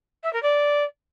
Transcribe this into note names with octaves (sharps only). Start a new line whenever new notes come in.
E5
A#4
D5